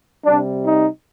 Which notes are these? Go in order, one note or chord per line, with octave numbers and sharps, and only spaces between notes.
C3 G3 D4
D#4